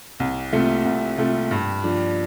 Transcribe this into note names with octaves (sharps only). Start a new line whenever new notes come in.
C2
C3 A3 F4
C2
C3 A3 F4
G2
F3 D4